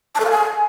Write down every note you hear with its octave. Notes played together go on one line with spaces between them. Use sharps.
A5
A4
F5
G#5